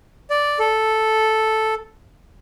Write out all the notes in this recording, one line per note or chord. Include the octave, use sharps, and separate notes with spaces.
D5
A4